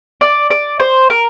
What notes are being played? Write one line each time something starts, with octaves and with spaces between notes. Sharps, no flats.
D5
D5
C5
A#4